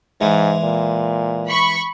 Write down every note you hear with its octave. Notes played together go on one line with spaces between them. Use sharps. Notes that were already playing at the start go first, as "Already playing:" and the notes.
G#2 E3 G#3
A#2
B5 C#6